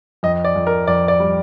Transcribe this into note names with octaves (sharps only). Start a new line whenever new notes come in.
F2 D#5
D5
F2
A#4
F2 D5
D5
G3